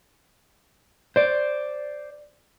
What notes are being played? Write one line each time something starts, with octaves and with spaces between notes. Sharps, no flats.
C5 D5